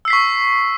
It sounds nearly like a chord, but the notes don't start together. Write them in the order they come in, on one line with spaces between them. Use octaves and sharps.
E6 C7 B6 C#6